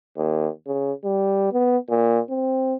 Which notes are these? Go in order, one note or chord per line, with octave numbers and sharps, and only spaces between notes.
D#2
C#3
G3
B3
A#2
C4